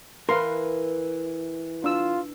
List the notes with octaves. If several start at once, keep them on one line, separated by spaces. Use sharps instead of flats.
E3 A#4 B4 F5 C6
D4 F4 E6